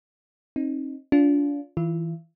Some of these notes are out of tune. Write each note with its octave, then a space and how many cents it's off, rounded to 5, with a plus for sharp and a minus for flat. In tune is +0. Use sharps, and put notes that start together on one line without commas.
C4 +40 D#4 +0
D4 -35 F4 +10
E3 -20 F4 -40